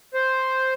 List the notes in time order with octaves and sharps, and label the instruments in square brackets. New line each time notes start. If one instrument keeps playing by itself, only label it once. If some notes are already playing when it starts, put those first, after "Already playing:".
[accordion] C5